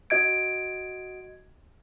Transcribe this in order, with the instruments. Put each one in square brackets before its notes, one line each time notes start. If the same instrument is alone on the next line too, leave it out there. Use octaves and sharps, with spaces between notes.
[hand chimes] F#4 D#5 G#6 D7